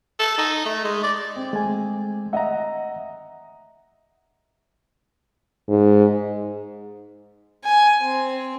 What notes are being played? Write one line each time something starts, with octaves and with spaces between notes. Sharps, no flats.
A4
D#4
A3
G#3
D5
C4
G#3 A3 G#5
D#5 E5 F#5 A#5
G#2
G#5
C4